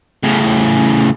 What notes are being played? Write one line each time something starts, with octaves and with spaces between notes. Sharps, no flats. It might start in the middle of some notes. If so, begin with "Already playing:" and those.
A2 C#3